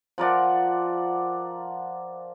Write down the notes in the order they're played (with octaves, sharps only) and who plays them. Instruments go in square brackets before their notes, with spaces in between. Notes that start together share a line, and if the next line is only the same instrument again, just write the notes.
[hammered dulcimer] F3 A#4 D5 F#5